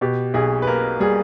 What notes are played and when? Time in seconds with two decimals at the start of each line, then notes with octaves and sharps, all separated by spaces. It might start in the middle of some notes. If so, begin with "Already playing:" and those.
0.01 B2 G4
0.34 B1 G#4
0.62 B4
0.67 A#3 A#4
1.00 G3 G#4